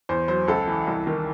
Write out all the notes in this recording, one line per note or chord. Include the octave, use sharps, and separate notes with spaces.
E2 C5
F#3 C5
C#2 A4
E3
C2
D#3